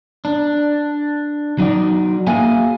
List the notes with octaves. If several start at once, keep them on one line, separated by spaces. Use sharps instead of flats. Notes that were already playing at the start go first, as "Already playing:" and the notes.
D4
F#3 D#4 F#4 D5
A#3 F#4 G#4 E5 F5 G#5